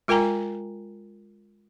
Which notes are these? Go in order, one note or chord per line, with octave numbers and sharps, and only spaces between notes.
G#3 F4 A#4 G5 G#5 A#5